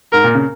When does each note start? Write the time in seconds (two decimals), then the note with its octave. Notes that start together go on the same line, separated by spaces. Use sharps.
0.13 G#2 A#4
0.24 A#2
0.35 C#3